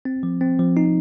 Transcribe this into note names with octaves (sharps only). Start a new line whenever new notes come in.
C4
F3
C4
F3
D#4